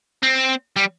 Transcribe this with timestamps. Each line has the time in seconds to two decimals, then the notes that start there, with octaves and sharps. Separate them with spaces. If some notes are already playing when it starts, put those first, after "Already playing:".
0.23 C4
0.76 G3